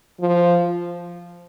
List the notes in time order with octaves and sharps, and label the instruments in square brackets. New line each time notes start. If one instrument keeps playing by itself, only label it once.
[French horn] F3